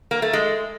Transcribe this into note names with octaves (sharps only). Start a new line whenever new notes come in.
A#3
A3
G#3